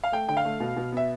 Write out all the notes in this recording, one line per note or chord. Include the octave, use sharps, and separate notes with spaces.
F5
A3 G5
D3 G5
F5
A3
B2
B2
B3 E5